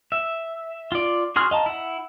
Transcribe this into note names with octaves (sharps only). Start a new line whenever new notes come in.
E5
F4 D5
F#4 G#4 C6 F6
D#5 F5 A5 A#5
E4 F#5